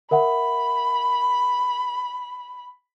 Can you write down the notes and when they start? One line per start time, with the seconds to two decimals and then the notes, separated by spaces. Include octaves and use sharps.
0.11 A#4 E5 F#5 B5